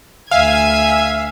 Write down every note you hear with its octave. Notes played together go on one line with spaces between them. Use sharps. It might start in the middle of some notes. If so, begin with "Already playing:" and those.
D2 E5 F5 G#5 G#6